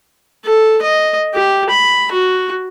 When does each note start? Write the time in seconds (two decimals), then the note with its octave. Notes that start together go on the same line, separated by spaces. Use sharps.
0.45 A4
0.82 D#5
1.34 G4
1.70 B5
2.12 F#4